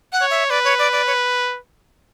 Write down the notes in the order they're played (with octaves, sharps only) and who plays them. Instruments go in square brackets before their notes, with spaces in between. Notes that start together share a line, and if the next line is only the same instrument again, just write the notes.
[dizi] F#5
[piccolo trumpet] C#5
[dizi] E5
[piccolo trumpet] B4 [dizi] D5
[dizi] C#5
D5
D5
C#5